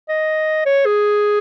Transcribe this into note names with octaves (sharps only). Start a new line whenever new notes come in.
D#5
C#5
G#4